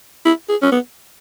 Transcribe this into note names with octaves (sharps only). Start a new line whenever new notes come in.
E4
G#4
C#4
B3